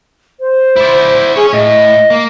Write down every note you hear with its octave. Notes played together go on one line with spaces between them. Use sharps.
C5
E4 D5
C#4 G#4 C#5
A2 D#5
A#3